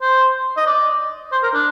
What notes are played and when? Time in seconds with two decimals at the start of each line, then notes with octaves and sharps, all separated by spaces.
0.01 C5
0.57 D#5
0.67 D5
1.32 C5
1.43 A#4
1.54 D4